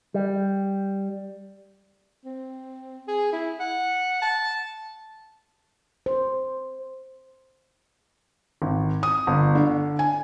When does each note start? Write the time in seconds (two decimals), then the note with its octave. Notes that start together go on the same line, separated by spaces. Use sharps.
0.14 G3
2.25 C4
3.08 G#4
3.33 E4
3.60 F#5
4.22 A5
6.06 C5
8.62 G#1
9.03 D#6
9.27 G1
9.55 D3
9.99 G#5